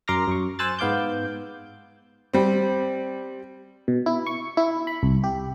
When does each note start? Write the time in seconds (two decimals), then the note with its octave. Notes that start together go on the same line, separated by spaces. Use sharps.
0.08 F#2 A#4 C6 D6 F6 A#6
0.28 F#2 C#6
0.59 C5 G#5 E6 F#6 A6
0.79 G#2 B3 F5 D6 G6
2.33 G3 C4
3.88 B2
4.06 E4
4.27 C#6
4.57 E4
4.87 B5
5.03 C2
5.24 G4